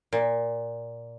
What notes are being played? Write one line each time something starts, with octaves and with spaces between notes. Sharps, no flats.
A#2